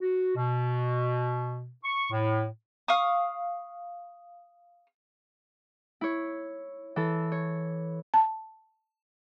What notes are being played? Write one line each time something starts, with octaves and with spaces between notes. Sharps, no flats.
F#4
B2
C#6
A2
F5 C#6 D#6
E4 C#5
E3 A4
C#5
A5